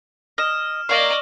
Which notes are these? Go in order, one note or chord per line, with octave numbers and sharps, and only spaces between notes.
D#5 F6 E7
A#3 D5 D#5 F5 C#6